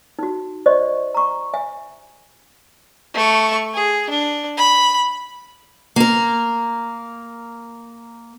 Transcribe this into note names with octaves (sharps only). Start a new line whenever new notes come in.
D#4 F#4
C5 D5 D#5 C6 C#6
A#5 C#6
E5 G#5
A3 C#6
G#4
D4
B5
A#3 A#4